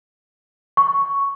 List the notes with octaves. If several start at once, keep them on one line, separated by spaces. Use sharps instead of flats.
C#6